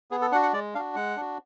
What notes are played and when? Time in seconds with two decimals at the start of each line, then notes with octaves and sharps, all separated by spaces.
0.11 B3 G#4
0.21 A4
0.32 D4 F#4 F#5
0.43 F#5
0.53 G#3 D5
0.75 D4 F#4 F5
0.95 G#3 F#5
1.16 D4 F#4